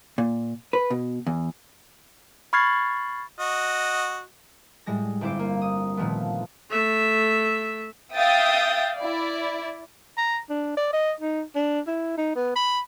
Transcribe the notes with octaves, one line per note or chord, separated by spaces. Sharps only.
A#2
B4
B2
E2
B5 C#6 F6 G#6 A6 C7
F#4 D#5
A2 G3 G#3 A#6
G1 C4 E4 C5 D6
A#3
D#6
A#2 D#3 F3 A3 B3
A3 E5
E5 F5 G5 D#6 G6 A6
E4 D5
A#5
D4
D5
D#5
D#4
D4
E4
D#4
B3
B5